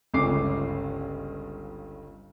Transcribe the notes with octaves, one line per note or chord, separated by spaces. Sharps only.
G1 C#2 G2 C#3 D6 C7